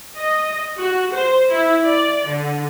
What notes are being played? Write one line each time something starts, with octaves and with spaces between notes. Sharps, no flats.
D#5
F#4
C5
E4
D5
D3